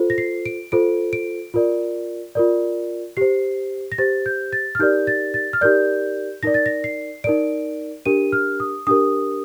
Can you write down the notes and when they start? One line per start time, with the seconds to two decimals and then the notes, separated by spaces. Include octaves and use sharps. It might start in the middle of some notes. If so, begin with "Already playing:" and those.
Already playing: F4 A4 C5
0.10 A#6
0.18 C7
0.46 D7
0.72 F4 A4 C5 D7
1.13 D7
1.54 F4 A#4 D5
2.35 F4 A#4 D5
3.17 G4 C5 C7
3.92 A#6
3.98 G4 C5 A6
4.26 G6
4.53 A6
4.75 F6
4.79 D#4 G4 A#4 D5 G6
5.07 A6
5.34 A6
5.53 F6
5.61 D#4 G4 A#4 D5 G6
6.43 D#4 A#4 D5 A#6
6.54 A6
6.66 A#6
6.84 C7
7.24 D#4 A#4 D5 D7
8.05 D4 G4 A#4 D#7
8.32 F6
8.60 D#6
8.87 D4 G4 A#4 D#6